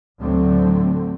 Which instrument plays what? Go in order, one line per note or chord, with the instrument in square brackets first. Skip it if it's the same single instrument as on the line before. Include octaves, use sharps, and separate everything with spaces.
[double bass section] D2 A2 D3 F#3 A3 C4